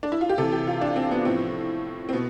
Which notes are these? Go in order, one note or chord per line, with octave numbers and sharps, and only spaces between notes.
D4
E4
F4
G4
C3 E3 A4
G4
F4
D4
C4
B3
A2 F3 C4
C4
B2 B3